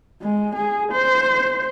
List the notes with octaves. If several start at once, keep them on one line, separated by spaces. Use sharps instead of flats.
G#3
G#4
C5